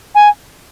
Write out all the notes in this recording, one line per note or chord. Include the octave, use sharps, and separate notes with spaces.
G#5